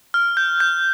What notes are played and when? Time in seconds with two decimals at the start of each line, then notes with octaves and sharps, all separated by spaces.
0.14 F6
0.37 G6
0.60 G6